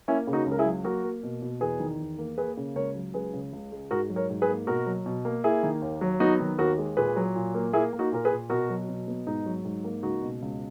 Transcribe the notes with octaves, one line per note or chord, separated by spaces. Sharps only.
A#3 C#4 E4
C#3
D#4 F#4
C#2
A#4
E4 G#4
F#3
A#3 F#4 A#4
A#3
B2
B2
E2 G#4 B4
D#3
E2
A#3
A#3 G#4 B4
C#3
C#2 A#4 C#5
F#3
C#2 G#4 B4
C#3
C#2
G#3
G#2 F#4 A#4
F#3
A#4 C#5
G#2
G#4 B4
A#3
B2 F#4 A#4
F#3
B2
A#3
A#3 E4 G#4
D#3
D#2
F#3
B3 D#4 F#4
D#3
D#2 F#4 A#4
G#3
A#2 G#4 B4
F#3
A#2
A#3
A#3 E4 G#4
A#3
D#4 F#4
A#2 A#4
G#4 B4
A#2
B2 F#4 A#4
F#3
B2
B3
G#2 D#4
F#3
G#2
A#3
C#2 D#4 F#4
B2
C#2